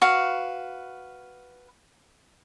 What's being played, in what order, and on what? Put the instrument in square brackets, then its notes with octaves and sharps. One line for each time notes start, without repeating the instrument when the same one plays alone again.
[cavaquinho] F#4 B4 F5